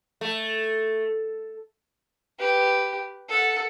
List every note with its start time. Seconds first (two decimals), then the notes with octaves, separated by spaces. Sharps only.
0.21 A3
2.39 G4 B4
3.29 A4 F#5